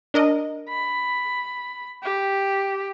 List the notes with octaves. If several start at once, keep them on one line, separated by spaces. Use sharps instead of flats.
D4 A#4 D#5
B5
G4